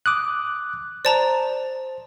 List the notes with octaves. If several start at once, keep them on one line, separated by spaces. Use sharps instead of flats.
D6 D#6 F#6
C5 D5 A5 A#5